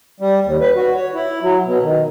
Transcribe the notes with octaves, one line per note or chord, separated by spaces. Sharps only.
G3
D#2
B4
F#4
C#5
E4
F#3
B2
D#3